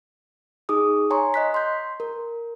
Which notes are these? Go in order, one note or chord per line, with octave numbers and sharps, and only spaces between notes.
D#4 G#4 D6 D#6
C#5 G#5 A#5 C6 C#6
D#5 F#6 B6
C6 G6
A#4